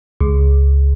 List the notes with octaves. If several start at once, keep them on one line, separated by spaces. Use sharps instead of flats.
C#2